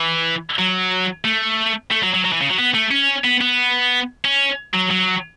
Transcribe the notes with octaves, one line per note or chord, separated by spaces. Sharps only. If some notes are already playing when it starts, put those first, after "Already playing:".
Already playing: E3
F#3
A3
A3
F#3
F#3
F#3
E3
C#3
F#3
B3
A3
C#4
B3
B3
C#4
F#3
F#3